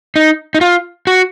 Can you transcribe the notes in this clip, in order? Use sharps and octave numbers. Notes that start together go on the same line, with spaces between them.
D#4
D#4
F4
F#4